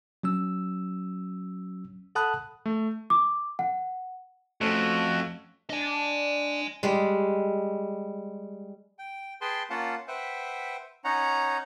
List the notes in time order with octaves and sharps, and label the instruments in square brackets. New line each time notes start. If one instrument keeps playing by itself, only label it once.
[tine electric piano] F#3 C#4 E6
A4 F#5 A5 B5 D#6 F#6
[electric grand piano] A3
[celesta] D6
F#5
[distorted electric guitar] F2 [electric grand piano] A3 C#4 [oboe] F#4
[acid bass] D4 [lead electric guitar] D#5 G#5
[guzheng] G3 G#3
[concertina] G5
G#4 B4 G5 A5 C6
A#3 C#4 F4 F5 F#5 A5
B4 C5 E5 F#5 G5
C#4 D#4 C#5 F#5 A#5